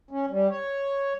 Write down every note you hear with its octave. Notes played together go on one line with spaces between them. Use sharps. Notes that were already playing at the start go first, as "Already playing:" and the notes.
C#4
G3
C#5